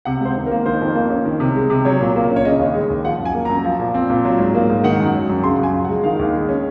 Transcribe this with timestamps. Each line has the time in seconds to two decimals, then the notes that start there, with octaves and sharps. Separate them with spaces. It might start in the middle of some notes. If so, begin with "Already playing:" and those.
0.05 C3 F#5
0.21 C#2 C5
0.36 D#3
0.46 A#4
0.51 A#3
0.66 D#3 C5
0.81 F2
0.95 A#3
1.10 C#4
1.26 D#3
1.40 C3
1.55 G#3
1.70 C3
1.85 F#3 C#5
2.01 A#2
2.16 A#3
2.30 C#4
2.36 C#5
2.45 C#3 D#5
2.60 D#2
2.75 G#3
2.90 D#2
3.05 F3 F#5
3.19 F#2
3.25 G#5
3.35 A#3
3.45 F#2 A#5
3.64 F3
3.79 A#2
3.94 C4
4.10 A#2
4.25 F#3
4.39 G#2
4.54 A#3
4.70 G#2
4.84 D#3 F#5
5.00 F#2
5.14 F#3
5.30 F#2
5.43 C#3 C6
5.59 F#2 G#5
5.74 F3
5.85 F#5
5.89 G#3
6.04 D#3 F5
6.19 D#2
6.34 G#3
6.48 C#4